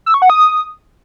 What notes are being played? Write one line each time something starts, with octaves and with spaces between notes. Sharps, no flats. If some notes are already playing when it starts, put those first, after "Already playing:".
E6
C#6
F#5
D#6